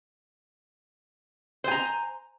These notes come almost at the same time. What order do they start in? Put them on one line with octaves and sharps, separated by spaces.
C5 G#5 A#5